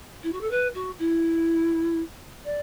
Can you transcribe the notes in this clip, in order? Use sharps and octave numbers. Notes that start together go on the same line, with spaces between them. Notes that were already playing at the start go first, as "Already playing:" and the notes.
E4
F#4
A4
B4
F#4
E4
D5